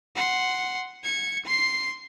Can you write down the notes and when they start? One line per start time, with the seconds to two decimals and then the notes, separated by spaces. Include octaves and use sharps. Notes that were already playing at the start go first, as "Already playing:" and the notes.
0.16 F#5 C6
1.04 G#6 C#7
1.45 C6 C7